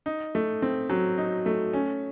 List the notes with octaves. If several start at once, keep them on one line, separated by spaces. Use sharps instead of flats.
D#4
A3
C4
F#3
D#4
A3
C#4